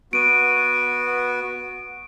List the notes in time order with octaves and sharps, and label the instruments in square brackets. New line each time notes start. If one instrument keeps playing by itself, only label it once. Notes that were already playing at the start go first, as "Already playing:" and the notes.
[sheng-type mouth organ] B3 F#4 [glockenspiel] D7 D#7